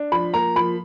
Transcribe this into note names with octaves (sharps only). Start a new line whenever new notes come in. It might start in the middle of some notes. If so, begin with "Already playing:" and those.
Already playing: D4
F3 B5
A#3 A#5
F3 B5